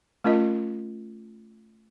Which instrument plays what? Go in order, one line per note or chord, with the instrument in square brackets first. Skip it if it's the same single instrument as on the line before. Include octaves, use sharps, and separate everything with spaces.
[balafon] A3 C#4 F4 A#4 D#5